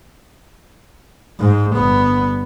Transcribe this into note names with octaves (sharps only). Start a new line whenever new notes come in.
G#2
G1 B3